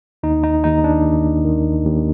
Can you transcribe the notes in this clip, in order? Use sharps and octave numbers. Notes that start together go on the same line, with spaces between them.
D#2 D#4
D#4
D#2 D#4
D4
D#2
D#3
D#2